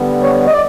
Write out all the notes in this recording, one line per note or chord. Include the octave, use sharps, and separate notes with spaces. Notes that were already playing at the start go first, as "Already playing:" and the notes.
Already playing: D3 G3 B3
C#5
D#5
D5